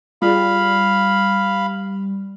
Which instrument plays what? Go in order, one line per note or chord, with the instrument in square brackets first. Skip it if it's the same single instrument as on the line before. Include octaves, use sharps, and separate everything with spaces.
[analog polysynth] G3 [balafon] F4 G#4 [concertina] F5 B5